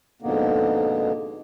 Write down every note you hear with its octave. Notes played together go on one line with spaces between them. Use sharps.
F2 G#2 B2 D3 A#3 B3